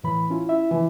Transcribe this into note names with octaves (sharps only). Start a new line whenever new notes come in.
A2 E3 B5
C#4 E4 F4
E4 E5
E3